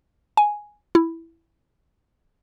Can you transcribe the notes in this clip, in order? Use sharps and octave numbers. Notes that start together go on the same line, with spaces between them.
G#5
E4